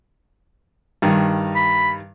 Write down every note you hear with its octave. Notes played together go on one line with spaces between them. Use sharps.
G2 D#3
B5